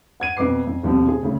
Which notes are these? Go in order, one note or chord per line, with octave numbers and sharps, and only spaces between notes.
F#5 G#6 D#7
F2 B2 B4 D6 C7
F2
D#1 D#2 B2 F3 C4
G#4
D2 C#3